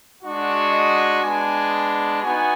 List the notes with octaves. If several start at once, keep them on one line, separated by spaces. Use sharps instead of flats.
G#3 D4 F#4
D#5
G#3 B3 D4 G#5
B3 D#4 F#4 G#5